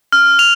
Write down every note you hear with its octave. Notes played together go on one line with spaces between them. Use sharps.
F6
F7